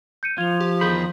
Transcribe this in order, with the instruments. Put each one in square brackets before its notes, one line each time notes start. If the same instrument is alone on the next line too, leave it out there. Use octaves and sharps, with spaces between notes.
[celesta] G6 C#7 D#7
[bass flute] F3 [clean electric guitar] F4 [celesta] G#6 F7
[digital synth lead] G4
[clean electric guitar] E2 D#3 B5 [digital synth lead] G#4 [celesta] G6